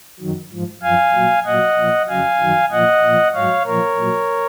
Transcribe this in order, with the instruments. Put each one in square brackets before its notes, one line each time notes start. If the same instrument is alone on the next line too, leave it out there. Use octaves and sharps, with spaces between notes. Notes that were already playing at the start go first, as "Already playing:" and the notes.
[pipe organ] F#2 D#3 F#3
G#2 F3
F#2 F3 F5 G#5
A#2 F#3
A#2 F#3 D#5 F#5
A#2 F3
F2 C#3 F#3 F5 G#5
F#2 D#3 F#3
A#2 F3 D#5 F#5
A#2 F3
G#2 F#3 C#5 F5
A#2 F3 A#4 C#5
A#2 F#3